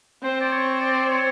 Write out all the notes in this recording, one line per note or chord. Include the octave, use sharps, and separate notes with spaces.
C4 C5
D5
C#5
D5
C#5